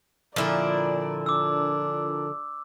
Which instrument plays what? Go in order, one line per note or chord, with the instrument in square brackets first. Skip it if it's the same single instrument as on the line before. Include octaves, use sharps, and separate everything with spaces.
[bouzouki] A#2 E4 [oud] D3 F3 [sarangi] D5
[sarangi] D4 [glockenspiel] D6 E6